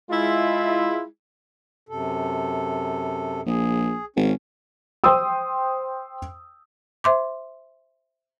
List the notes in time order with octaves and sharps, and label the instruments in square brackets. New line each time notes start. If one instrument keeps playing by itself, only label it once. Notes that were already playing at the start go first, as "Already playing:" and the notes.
[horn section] G#3 E4 F4
[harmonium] F#2 C3 A4
[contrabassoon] A#1 [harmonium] G#4
[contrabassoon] G#1 [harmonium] C#4
[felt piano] C5 G5 C6 D#6 E6
[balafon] C5 E5 C6 D6